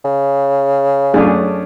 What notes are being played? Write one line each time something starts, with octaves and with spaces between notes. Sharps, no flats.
C#3
F#2 A3 D4 G#4